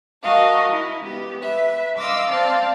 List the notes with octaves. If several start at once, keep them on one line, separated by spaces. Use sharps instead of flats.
F#4 A#4 D#5 F5 A5
E4
B3 G4
B4 E5
D#5 F5 C6 D6 E6
C4 C5 D5 F5 A5